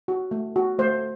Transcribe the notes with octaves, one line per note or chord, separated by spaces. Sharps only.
F#4
A3
F#4
A3 C5